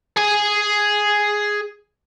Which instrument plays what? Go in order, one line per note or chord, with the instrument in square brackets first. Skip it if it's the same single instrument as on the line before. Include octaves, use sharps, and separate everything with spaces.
[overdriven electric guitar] G#4 G#5